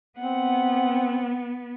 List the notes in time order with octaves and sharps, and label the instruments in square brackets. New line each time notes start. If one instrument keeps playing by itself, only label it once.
[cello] B3 [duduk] C4 [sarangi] F#5